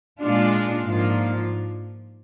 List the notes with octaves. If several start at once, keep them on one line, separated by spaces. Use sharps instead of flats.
A#2 G#3 D4 F4
G#2 F3 A#3 D4 F4